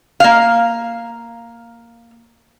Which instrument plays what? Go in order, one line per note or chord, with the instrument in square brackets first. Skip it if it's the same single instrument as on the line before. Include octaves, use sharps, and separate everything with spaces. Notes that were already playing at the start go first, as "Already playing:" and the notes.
[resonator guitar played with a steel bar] A#3 F5